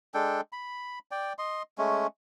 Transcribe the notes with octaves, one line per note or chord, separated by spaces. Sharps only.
G#3 D4 A4 G5
B5
D5 G5
D#5 C6
G#3 A3 C#4